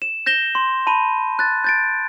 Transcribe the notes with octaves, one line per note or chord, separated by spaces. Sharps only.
E7
G6 A#6 E7 G7
C6
A5 B5 D#7
F#6 A6
G6 A6 D7